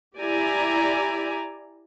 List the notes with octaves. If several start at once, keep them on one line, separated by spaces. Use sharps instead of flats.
E4 G4 D5 G#5 A#5